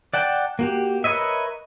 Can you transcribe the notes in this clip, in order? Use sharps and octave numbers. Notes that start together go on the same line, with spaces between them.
D5 F#5 G5 A5
A#3 F#4 G4
A#4 B4 C#5 D#5 E5